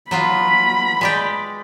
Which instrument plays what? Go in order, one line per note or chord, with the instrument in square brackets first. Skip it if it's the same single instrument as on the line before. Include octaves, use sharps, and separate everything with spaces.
[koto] F#3 B3 F4 [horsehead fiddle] B5
[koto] G#3 D5 G5